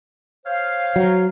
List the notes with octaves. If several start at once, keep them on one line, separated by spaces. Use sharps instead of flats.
C5 C#5 F5
F#3